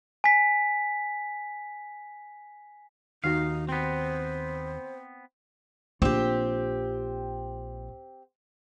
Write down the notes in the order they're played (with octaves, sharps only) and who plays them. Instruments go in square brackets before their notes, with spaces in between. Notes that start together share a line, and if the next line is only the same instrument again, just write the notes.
[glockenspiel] G#5 B6
[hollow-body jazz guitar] D#2 D#3 F#4 [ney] D#4 [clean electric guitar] F5
[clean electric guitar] B3 C4 [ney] C5
[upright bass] A#1 F4 [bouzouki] C4 G4